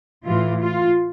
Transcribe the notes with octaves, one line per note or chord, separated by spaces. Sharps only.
A2 E3 F4
F4